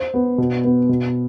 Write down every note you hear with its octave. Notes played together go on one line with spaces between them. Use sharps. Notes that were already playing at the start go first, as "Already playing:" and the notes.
Already playing: C5
B3
B2
B3
B2